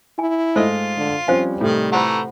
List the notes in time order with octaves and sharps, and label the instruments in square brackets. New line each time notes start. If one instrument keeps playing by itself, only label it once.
[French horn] E4 [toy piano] G#5
[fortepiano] G#2 A3 D#5 [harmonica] F4 [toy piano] C5
[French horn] D3
[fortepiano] F3 C4 C#4 [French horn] G3 [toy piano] C5 F5 G#5
[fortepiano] A2 C3 [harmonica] D#3
[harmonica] E3 A3 A#5 [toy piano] F4 C5 F#5